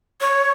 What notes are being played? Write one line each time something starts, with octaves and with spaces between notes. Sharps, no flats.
C#5